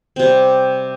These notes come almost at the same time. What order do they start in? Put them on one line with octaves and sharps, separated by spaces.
C4 C3 G3